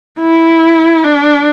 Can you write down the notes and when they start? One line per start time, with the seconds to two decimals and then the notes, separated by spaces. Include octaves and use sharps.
0.19 E4
1.04 D4